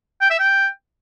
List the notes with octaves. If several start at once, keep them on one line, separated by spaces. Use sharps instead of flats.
G5
E5
G5